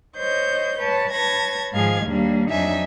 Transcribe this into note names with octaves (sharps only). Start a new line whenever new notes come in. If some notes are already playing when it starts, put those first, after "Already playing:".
C5 C#5 D#5 G6
B4 C#5 A5
B4 C#5 A5 G#6 A#6
G#2 D#3 F3 G#4 F5 G#6
D#2 G3 A#3 D4
F2 F#3 D4 D#4 E5 G#5